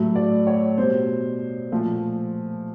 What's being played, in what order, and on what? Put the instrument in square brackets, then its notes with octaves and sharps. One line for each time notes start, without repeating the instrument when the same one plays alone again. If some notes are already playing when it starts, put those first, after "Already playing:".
Already playing: [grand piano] A2 F#3 A3
D5
C#5
B2 G3 C5
A#2 F3 A3